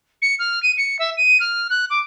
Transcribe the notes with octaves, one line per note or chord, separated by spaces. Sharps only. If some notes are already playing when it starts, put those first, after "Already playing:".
C#7
F6
D#7
C#7
E5
D#7
F6
F#6
D6